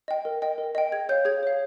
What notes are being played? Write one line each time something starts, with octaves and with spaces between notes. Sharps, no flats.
D#5 G5
A#4
D#5 G5
A#4
D#5 G5
G#4 G#6
C#5 F5 G6
G#4 G#6
C#5 F5